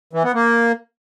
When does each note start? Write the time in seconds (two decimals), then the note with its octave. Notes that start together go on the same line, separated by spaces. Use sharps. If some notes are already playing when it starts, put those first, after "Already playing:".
0.13 E3
0.24 B3
0.34 A#3